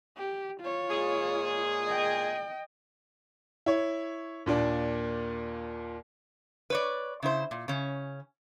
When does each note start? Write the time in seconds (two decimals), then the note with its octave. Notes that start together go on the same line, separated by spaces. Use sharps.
0.17 G4
0.60 F4 C#5
0.90 A#2 G#3 G#4
1.87 D#5 G5
3.66 E4 C#5
4.46 D#2 A#2 D4
6.70 B4 C#5 D5
7.23 C#3 E4 C5
7.51 A#2
7.68 C#3 C#4